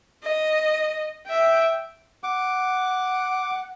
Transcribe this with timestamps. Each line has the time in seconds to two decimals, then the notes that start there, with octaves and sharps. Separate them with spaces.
0.23 D#5
1.27 E5 G5
2.24 F#5 D6